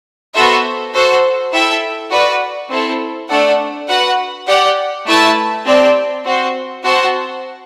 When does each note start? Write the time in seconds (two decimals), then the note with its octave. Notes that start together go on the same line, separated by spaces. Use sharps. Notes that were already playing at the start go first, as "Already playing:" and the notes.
0.34 B3 F#4 A4 C5 E5
0.93 F#4 A4 C5
1.52 E4 A4 E5 G5
2.11 F#4 B4 D5
2.70 C4 E4 A4
3.29 A3 D4 A4 D5 F#5
3.88 F#4 B4 F#5
4.47 G4 D5 F#5
5.06 A3 E4 B4 E5 A5
5.65 C4 G4 D5 A5
6.24 C4 F#4 C5
6.83 C4 F#4 C5 F#5 A5